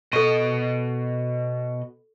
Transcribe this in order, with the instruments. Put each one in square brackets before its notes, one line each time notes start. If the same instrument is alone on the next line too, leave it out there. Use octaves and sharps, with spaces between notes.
[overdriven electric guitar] B2 D#5 [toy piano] A4 C#6